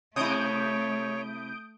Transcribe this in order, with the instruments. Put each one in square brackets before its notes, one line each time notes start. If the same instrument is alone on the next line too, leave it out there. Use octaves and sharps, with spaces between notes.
[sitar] C3 E4 [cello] A3 [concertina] C#5 [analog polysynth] D#6 G6 D7